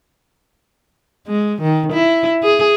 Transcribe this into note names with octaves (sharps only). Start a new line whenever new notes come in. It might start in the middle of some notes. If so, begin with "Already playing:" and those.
G#3
D#3
E4
G#4